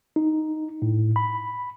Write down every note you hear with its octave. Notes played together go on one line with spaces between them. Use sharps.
D#4
A2
B5